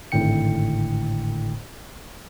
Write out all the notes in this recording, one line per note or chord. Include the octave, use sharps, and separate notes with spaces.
G#1 A2 D3 G5 C#7